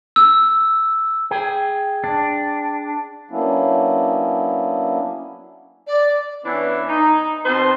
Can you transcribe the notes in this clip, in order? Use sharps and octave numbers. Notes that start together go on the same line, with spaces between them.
E6
G#4 G5
D4
F#3 A#3 B3 C#4 D4 E4
D5
E3 B3 C#4 D4 E4
D#4
B2 C4 D#4 C5 A5 C6